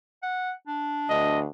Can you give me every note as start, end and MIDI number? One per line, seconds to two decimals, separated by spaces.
0.22 0.51 78
0.67 1.48 62
1.09 1.46 38
1.09 1.39 75